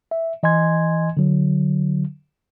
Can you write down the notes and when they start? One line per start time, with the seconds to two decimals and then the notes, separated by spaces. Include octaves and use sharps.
0.11 E5
0.43 E3 D#5 G#5 C6 G#6
1.17 D3 F#3